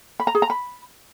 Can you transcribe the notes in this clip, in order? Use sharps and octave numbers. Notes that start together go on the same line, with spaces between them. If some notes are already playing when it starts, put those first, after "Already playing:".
B5
A#5
G#4
A#5
B5